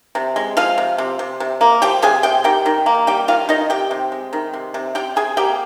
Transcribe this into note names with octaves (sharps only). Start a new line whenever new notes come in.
C3
G#3
F3 F4 F5
C3
C3
C3
C3
A#3
F3 G4 G5
C3 G#4 G#5
C3 G4 G5
D#3 G4 G5
D#3
A#3
G3 G4 G5
D#3 F4 F5
D#3 D#4 D#5
C3 G4 G5
C3
G#3
D#3
C3
C3
C3 G4 G5
C3 G#4 G#5
A#3 G4 G5